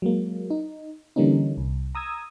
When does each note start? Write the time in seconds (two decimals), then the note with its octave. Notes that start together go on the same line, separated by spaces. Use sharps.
0.02 F#3 G#3 A#3
0.50 D#4
1.16 D3 E3 G3 A#3 C#4 D#4
1.57 C2
1.95 A#5 D#6 E6 G#6